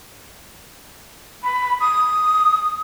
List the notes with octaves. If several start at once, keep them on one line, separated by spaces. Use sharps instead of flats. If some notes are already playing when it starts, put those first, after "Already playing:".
B5
D#6